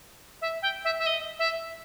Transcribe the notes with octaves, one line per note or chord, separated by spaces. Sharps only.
E5
G5
E5
E5
D#5
E5